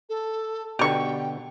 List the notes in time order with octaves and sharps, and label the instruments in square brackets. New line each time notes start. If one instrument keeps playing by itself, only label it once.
[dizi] A4
[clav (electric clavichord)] B2 D3 [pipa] G4 C#6 [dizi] G5